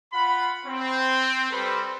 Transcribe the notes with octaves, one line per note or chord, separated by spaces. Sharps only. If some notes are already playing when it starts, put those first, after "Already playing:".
F4 F#5 B5
C4
G3 A4 B4 C5